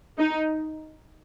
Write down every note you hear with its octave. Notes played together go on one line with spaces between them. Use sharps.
D#4